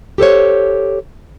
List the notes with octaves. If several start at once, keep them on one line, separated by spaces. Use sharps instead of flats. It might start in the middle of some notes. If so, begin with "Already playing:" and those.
G4 A4 C5 C#5